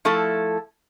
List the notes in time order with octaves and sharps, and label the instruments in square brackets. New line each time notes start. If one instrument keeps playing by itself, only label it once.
[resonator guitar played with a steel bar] F3 A3 E4 A4